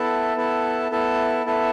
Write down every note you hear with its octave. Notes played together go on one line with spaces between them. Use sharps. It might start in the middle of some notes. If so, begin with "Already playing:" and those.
Already playing: B3 E4 A4 E5 A5
B3 E4 A4 E5 A5
B3 E4 A4 E5 A5
B3 E4 A4 E5 A5